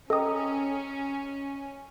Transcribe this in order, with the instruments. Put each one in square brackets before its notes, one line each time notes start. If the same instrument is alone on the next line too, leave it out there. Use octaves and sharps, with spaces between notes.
[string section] C#4 [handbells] A4 D#6 [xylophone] D#5 G5 A#5